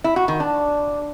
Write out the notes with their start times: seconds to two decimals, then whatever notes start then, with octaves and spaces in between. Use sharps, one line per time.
0.04 E4
0.16 F#4
0.28 D#3
0.40 D4